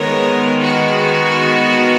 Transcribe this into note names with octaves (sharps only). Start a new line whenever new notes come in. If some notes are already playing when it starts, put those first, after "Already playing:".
Already playing: D#3 G#3 B3 A#4 C#5
F#4